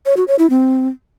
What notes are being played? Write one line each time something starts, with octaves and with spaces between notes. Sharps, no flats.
C#5
F#4
C#5
E4
C4